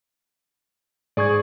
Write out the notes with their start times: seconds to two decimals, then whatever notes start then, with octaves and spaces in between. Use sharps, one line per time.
1.17 G#2 G#4 D5 C#6 G#6